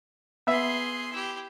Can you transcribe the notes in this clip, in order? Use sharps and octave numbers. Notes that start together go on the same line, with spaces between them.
B3 G#4 E5 C6
E4 G4